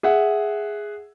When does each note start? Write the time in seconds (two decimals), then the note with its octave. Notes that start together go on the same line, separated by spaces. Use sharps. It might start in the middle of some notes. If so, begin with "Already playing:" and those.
0.03 G#4 E5 F#5